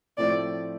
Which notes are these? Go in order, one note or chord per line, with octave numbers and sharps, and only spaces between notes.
A2 F3 A3 C4 E4 D5